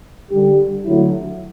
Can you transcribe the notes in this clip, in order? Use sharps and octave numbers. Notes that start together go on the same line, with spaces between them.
D3 G3 D4 G4
D3 F#3 A3 E4